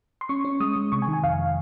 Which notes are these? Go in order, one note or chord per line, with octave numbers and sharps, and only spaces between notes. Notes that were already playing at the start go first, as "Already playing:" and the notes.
C6
C#4 C#6
C#4
G#3 D#6
G#3
C3 C#6
G#5
D#3
G#5
F2 F5